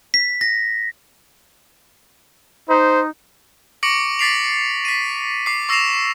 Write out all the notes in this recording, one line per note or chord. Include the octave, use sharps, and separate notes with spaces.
B6
A#6
D#4 C5
C#6 D6 A#6 C#7 D7 F#7
D6 A6 B6 C7 D7 F7
B6 D#7
D6 C7
C#6 E6 A#6 C7 E7 F7